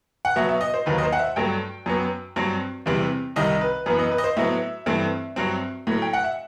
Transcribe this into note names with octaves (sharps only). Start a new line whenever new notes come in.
F#5
B2 F#3 B3 E5
E5
D#5
C5
D#2 D#3 F#3 B4
D#5
C5
F#5
E5
G2 F#3 A3 G5
F#2 F#3 B3
G2 F#3 C4
E2 C3 E3 G3 C4
C2 C3 D#3 G3 D#5
B4
F#2 E3 B3 B4
D#5
B4
D#5
C5
A2 F#3 B3 E5
G2 E3 A3 C4
G2 F#3 C4
A2 F#3 A3
G5
F#5
E5